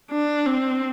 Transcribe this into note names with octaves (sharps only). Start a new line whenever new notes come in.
D4
C4